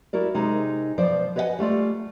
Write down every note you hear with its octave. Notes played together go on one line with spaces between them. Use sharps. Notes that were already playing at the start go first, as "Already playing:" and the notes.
E4 F#4 A#4 D5
C3 G#3 D#4
B2 F3 C5 D5
B4 C#5 D#5 E5 F#5 G#5
G3 A3 F4 D5